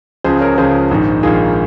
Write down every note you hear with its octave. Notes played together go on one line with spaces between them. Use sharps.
C#2 C#3 F3 G#4 C5
A#4 C#5
C#2 C#3 F3 G#4 C5
A#1 G#2 D#3
A#1 G#2 D#3 F4 G#4